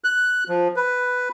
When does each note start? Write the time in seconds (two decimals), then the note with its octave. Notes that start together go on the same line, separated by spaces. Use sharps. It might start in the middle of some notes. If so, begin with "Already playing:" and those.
0.04 F#6
0.49 F3
0.76 B4